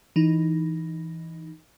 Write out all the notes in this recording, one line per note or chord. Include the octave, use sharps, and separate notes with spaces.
E3 D#4